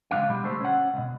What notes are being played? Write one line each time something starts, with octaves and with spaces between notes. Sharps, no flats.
C#2 D#3 D4 F5
B2 G3
D3 G3 A3 C5
C#4 F#5
C#2 B2